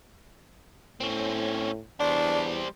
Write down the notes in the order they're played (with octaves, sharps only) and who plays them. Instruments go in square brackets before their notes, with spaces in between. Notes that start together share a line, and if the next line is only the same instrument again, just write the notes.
[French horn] A2 [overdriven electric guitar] C4 C#4
[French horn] E2 [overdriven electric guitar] G3 C5 [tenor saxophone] D4